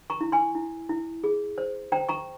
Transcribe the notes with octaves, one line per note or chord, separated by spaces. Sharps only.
A#5 C#6
E4
G#5 C6
E4
E4
G#4
C5
C5 G5 A#5
A#5 C#6